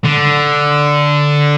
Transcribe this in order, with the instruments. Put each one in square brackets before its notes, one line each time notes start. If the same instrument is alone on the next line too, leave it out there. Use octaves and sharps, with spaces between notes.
[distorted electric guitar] D3